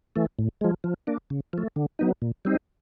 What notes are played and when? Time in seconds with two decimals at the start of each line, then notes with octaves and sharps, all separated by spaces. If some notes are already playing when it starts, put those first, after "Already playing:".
0.16 E3 A3
0.39 A2
0.61 F3 G#3
0.84 F3
1.07 A#3 D4
1.30 C#3
1.53 F3 A3
1.76 D3
1.99 F#3 B3 D#4
2.22 A#2
2.45 G3 C4 D#4